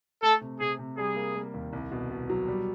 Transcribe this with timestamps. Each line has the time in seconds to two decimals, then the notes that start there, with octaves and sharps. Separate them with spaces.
0.23 A3 A4
0.41 C3
0.60 C3 G#4
0.79 C3
0.97 G3 G#4
1.16 A#3
1.36 A#3
1.54 D#2
1.73 C2
1.91 B2
2.11 B2
2.30 F#3
2.48 G3